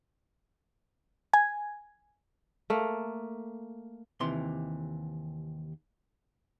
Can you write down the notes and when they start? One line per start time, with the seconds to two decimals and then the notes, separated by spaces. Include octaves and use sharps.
1.33 G#5 G#6
2.70 A3 A#3
4.20 D#2 C3 E3 C6